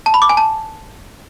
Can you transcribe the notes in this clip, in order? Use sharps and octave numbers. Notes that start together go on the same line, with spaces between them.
A5
B5
D6
G#5
A5